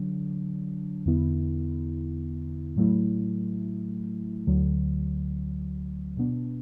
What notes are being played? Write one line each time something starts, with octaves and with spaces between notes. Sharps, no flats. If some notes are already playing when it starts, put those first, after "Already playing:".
Already playing: D3 F#3 D4
E2 D3 B3 E4
A2 F#3 A3 E4
D2 D3 F#3
B2 B3 D4